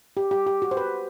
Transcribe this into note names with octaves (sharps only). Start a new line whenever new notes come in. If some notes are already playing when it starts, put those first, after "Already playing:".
G4
G4
G4
F#4
C5
B4